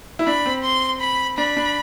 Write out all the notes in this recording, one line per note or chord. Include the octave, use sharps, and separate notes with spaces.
E4
D4 B5
C4
C6
B5
D4 B5
D4